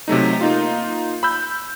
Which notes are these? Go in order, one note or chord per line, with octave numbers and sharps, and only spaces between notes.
C3 F#3 A3 D#4
A#3 D#4 F4
B5 E6 G6